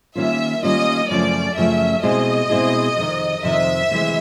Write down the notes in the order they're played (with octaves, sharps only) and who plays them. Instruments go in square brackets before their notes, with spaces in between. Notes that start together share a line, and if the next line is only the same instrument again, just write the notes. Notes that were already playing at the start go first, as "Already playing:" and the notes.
[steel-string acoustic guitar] D#3 G3 A#3 C#4 F4 [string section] E5
[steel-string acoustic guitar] D#3 G3 A#3 C#4 F4 [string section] D#5
[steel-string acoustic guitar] F#2 C#3 F3 A3 C#4 [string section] D5
[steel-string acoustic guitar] F#2 C#3 F3 A3 C#4 [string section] E5
[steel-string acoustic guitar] B2 G#3 C4 E4 G#4 [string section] D#5
[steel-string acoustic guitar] B2 G#3 C4 E4 G#4
F2 C3 D#3
[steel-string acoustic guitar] F2 C3 D#3 [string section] E5
[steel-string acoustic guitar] D2 C3 E3 G#3